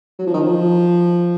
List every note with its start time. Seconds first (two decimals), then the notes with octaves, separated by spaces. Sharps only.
0.19 F#3
0.26 F3
0.34 D#3
0.40 F3